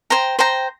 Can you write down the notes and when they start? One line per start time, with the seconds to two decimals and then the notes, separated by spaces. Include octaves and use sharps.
0.10 C5 G5 A#5
0.39 C5 G5 A#5